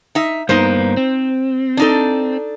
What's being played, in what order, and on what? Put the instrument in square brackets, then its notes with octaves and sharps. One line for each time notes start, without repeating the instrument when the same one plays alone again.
[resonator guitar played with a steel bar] D#4 E5
[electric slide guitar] G2 A#3 B3 [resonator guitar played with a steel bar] D#4 C5
[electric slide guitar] C4
[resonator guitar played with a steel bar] D4 D#4 A4